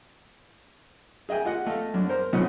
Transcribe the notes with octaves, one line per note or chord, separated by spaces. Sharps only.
G#4 D#5 E5 G5 G#5
F4 G4 D#5 F#5
A3 D#5 F5
F#2 D4
A#4 C5
F#2 C#3 F3 D#4 D#5 F#5